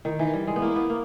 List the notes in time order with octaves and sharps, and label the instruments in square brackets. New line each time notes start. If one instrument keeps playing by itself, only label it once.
[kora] D#3 [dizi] E4
[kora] E3 [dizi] D#4
[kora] G3
G#3
B3
[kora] A#3 [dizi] E4
[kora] B3
A#3